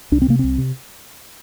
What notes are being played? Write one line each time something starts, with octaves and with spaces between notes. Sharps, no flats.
C2 D4
C4
C3 A#3
C2 C4
C3